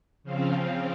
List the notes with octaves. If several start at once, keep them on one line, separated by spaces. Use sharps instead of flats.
C#3 F3 C4 F4